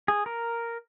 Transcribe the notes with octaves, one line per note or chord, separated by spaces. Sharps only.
G#4
A#4